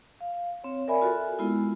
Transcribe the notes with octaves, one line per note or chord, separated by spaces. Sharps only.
F5
C4 C#5
A#4 D5 E5 G#5 B5
F4 F#4 A4
G#3 B3 E4 F4